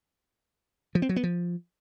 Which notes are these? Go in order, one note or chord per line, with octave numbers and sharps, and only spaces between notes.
F3
C4
F#3
B3
F3